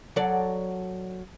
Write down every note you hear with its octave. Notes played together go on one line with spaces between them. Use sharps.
F#3 A4 D5